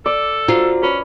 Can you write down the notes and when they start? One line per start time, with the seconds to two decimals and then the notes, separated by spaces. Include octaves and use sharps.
0.06 A4 D5
0.48 F4 F#4 C5 A#5
0.83 C#4 B4